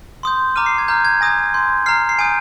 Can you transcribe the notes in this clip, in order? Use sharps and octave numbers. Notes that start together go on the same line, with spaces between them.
C6 D#6 G6
A#5 D6 F6 D#7
C7
G#6
A#5 F6 G6
G#6
G#5 D#6 G6 A#6
C6 G6
A#5 F6 C7
C7
G#5 D#6 G6 D7